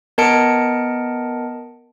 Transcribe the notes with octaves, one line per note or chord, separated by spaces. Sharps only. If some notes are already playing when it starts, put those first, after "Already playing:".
B3 A#4 D#5 A5 C#7 D7